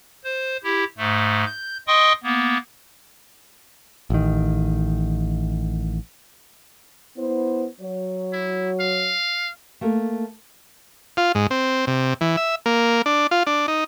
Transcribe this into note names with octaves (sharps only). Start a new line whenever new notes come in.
C5
E4 G4
G#2 A3
G6
D#5 G5 C6 C#6 D#6
A#3 B3
A1 D#3
B3 E4 C5
F#3 C#5
E4
F5
A3 A#3 A4
F4
G#2
C4
C3
E3
E5
A#3
D4
F4
D4
D#4